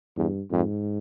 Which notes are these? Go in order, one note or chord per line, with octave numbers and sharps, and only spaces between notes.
E2 G2
F2 G#2